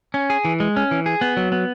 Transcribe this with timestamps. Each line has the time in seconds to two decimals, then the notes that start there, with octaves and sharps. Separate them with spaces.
0.14 C#4
0.30 G#4
0.45 E3
0.60 G#3
0.76 C#4
0.91 E3
1.06 G#4
1.21 B3
1.37 F#3
1.52 B3